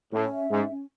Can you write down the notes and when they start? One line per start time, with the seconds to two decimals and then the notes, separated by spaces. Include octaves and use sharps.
0.13 A2 C#4
0.32 E5
0.50 G#2 C#4
0.69 C#4